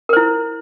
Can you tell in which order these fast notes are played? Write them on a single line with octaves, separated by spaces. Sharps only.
A#4 C5 E4